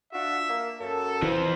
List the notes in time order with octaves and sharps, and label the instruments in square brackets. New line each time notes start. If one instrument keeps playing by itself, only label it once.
[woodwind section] D4 F4 F#4 [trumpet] E5
[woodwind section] A#3
[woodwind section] F#2 [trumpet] A4
[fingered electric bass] E3 [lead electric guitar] F3 C4